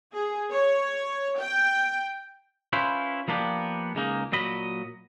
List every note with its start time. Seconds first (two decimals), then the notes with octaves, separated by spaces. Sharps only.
0.13 G#4
0.51 C#5
1.38 G5
2.73 C#4 E4 F4 B4 C5
3.28 F3 A#3 B3 D4 G4
3.95 C#2 G#3 A#3 D#4
4.32 A#2 F#3 D#5 B5